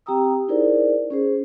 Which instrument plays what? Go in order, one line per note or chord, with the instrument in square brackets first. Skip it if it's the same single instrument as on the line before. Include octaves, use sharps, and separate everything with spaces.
[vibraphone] C4 G4 G5 A#5 D#6 E6
D#4 E4 G#4 A#4 C5 D5
C#4 G#4 C5